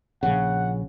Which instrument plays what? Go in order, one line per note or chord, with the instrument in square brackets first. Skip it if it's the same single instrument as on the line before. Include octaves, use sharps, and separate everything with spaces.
[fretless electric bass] A#1 C#3 [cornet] F#5